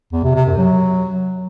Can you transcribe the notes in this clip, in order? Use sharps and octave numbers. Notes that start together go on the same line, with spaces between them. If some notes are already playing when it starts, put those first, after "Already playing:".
E2
C3
C3
F#2
F#3